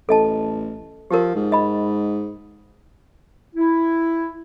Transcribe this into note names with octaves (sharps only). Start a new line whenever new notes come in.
A1 A4 D#5 A5
F3 G4 A#4
G#2
D#5 B5
E4